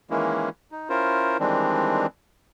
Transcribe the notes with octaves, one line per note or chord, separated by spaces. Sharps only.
D#3 E3 G#3 A#3 C#4 E4
D#4
C#4 E4 F4 A#4 C5
D#3 E3 G3 G#3 C4 D4